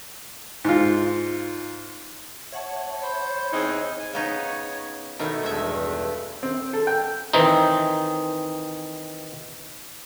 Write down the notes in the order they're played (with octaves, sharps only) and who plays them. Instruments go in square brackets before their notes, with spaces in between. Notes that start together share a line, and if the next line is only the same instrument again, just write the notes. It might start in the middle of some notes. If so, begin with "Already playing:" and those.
[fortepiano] G#2 F4
[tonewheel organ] C#5 [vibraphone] E5 F#5 A5
[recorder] C5 [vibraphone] B5
[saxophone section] E2 C4 D#4 [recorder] G#4
[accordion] G#5
[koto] C#3 B3 D#4 [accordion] C#5
[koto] B2 D#3 A3 [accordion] E4
[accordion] E2 G2 A3 [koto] G#3 E5
[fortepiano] C4
A4
G5
[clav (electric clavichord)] D#3 E3 C4 D#4